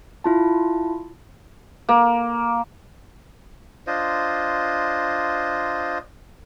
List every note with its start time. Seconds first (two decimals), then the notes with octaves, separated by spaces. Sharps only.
0.24 E4 F4 A5
1.89 A#3
3.87 D4 F4 C5 D#5